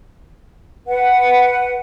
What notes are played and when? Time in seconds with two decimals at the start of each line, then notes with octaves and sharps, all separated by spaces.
0.87 B4 F#5